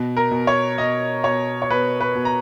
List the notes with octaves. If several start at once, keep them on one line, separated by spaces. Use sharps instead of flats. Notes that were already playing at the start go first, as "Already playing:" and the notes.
Already playing: B2
A#4
B2
C#5
B2 D#5
B2 C#5
C#5
B2 B4
B4
B2
A#5